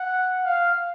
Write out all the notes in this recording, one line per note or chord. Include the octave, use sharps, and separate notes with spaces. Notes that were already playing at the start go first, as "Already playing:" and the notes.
Already playing: F#5
F5